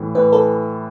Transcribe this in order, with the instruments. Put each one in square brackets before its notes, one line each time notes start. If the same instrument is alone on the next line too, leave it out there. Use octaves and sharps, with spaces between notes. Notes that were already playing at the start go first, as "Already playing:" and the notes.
Already playing: [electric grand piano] A2 E3
[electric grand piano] A2 [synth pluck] B4
[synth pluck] A4